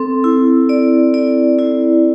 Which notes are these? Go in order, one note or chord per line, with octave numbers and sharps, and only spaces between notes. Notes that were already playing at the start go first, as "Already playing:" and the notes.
Already playing: C4 A4
E4
D5
D5
E4